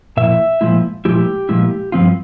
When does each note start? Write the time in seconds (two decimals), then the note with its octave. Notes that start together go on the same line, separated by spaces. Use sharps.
0.17 A#2 F3 E4 E5
0.61 A#2 F3 G#3 E4
1.05 A#2 F3 G#3 E4 G4
1.49 A#2 F3 G#3 E4
1.92 G2 F3 C4 F4